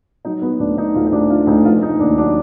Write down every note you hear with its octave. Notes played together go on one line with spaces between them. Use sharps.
F#3 D#4
F#3 B3
D2 D4
D3 D#4
D2 F4
D#4
D2 D4
D3 F4
D2 D#4
F1 F4
F1 D#4
D#2 D4
F#3 D4